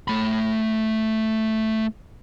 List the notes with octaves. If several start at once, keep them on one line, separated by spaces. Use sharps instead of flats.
A3 B5